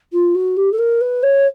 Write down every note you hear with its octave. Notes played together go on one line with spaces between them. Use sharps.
F4
F#4
G4
A4
A#4
B4
C#5